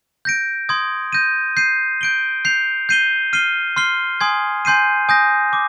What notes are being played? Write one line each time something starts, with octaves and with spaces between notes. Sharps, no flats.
G6 A#6 D7
C6 D#6 G#6
G6 A#6 D#7
G6 C7 D#7
G6 D7 G7
G6 C7 F7
G6 C7 D#7 G7
F6 C7 D#7 G7
C6 F6 C7 G7
G#5 C6 D#6 G#6
G#5 C6 G6 C7 D#7
G#5 D#6 G6 A#6
D6